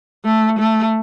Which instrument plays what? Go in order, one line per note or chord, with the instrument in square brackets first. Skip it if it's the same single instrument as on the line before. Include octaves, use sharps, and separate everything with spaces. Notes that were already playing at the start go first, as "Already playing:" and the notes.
[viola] A3
A3